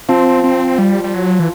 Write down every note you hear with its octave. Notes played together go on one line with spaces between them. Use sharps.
F3 C4
C4
G3
G3
F#3
E3